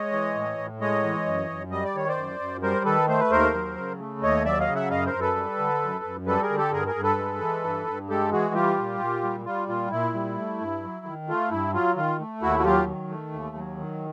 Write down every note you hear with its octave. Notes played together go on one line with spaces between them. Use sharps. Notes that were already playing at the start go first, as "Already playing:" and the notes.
Already playing: G#3 C#5 D#5
E3
A2
A2
G#3 C#5 D#5
E3
F#2
F#2
G3 D#5
D5
D#3 C#5
C5 D5
F#2
F#2
G3 A#4 C5
D#3 A4 B4
A3 C5
B4
D#2 A#4 C5
F#3
C#3
A3
D#2 C#5 D#5
F#3 D5 E5
D#5 F5
C#3
E5 F#5
F#2 D#5 F5
A#4 C5
F#2
A4 B4
G3
D3
F#2
F#2
G3 A4 B4
G#4 A#4
D3
G4 A4
G2 G#4 A#4
G#4 A#4
G2
A4 B4
G#3
E3
G2
G2
G#3 G4 A4
E3 F#4 G#4
G3 F4 G4
A#2
A#2
G3
G3 F4
A#2 F4
A#2 E4
G3
A3
G2
F#3
D#3
A3 F4
G2 E4
F#3 F4
D#3 F4
A3
D#2 E4 F#4
F#4
F#3 F4 G4
D#3
A3
D#2
F#3
D#3